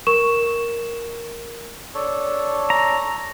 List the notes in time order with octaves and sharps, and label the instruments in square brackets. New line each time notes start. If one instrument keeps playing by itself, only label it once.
[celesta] A#4 C#6 E7
[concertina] D4 A4 C#5
[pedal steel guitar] A#5